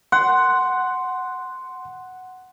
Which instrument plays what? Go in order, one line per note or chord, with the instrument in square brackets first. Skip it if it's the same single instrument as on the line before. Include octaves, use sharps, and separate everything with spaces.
[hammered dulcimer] F#5 [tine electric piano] C6